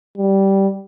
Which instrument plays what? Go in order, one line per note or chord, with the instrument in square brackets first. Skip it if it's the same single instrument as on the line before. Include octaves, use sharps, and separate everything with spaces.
[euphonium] G3